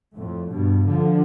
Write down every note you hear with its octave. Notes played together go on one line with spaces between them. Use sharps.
F2 A2
G2 B2
D3 F3